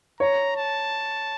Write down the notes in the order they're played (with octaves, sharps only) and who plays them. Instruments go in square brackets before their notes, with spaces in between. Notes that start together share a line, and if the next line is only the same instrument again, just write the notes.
[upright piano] C#5 [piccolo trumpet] A#5
[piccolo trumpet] A5